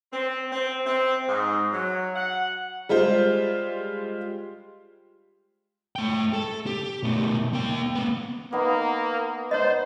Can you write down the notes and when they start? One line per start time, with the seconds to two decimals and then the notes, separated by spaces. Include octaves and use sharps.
0.13 C4
0.52 C4
0.86 C4
1.28 G#2
1.73 F#3
2.16 F#5
2.89 G3 G#3 F4 C5
5.96 A3 G5
6.33 A4
6.67 G4
7.03 B2 A3
7.53 A#3 G5
7.95 A#3 B3
8.52 A#3 B3 D#4
9.51 C5 C#5 D#5